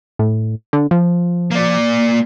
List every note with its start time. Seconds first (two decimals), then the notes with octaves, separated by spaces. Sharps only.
0.19 A2
0.73 D3
0.91 F3
1.51 A#3 D5